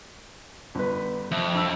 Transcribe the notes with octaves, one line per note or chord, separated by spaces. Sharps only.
G1 B4
F2 E5
G2 E6